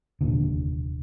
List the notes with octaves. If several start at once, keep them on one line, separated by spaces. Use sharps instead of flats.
F1 D#2 A#2 D3